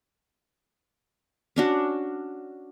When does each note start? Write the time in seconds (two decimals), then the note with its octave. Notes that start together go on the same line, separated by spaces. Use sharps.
1.56 C#4 D4 F#4